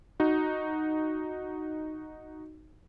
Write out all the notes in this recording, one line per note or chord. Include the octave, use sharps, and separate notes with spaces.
D#4 F#4